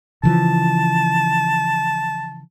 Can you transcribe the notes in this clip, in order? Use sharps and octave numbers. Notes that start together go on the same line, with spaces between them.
C#3 E3 F3 A5